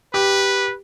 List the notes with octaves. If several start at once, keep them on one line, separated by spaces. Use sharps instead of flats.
G4 B4